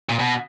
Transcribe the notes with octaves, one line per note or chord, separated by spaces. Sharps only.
A#2
B2